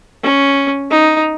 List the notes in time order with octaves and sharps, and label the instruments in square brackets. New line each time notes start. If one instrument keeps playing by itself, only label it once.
[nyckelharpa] C#4
D#4